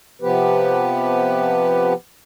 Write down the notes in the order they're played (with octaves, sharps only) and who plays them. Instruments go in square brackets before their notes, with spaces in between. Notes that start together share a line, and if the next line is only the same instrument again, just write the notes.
[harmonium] C3 F3 B3 G4 B4